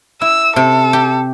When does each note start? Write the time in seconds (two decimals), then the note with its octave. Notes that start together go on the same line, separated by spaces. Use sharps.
0.22 E4 E6
0.56 C3 A4
0.93 G4